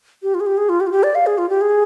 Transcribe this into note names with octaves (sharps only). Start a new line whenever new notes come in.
G4
F4
G#4
G4
G#4
F4
G4
F4
G4
D5
F5
G#4
F4
G4
G#4